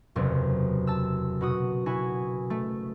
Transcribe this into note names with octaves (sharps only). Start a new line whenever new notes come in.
F#1 E2 C3
A5 E6
B2 F#4 D#6
E4 F#4 G#5
A3